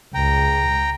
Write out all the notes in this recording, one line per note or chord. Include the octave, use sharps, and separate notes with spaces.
C#2 G5 A#5